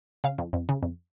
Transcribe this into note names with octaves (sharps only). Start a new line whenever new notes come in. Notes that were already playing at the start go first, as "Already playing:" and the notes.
C#3 F5
F2
F2
C#3
F2